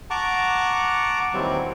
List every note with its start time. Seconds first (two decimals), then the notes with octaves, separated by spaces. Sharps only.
0.10 F#5 A5 A#5 C#6 D6
1.34 D#2 E3 F#3 G3 C4